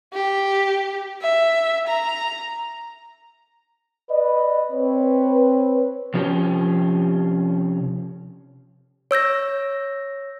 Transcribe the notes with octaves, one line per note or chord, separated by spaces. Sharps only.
G4
E5
A#5
B4 D5 D#5
C4 B4 C#5
C3 F3 C#4 F4 G4
C#5 E6 G6 A#6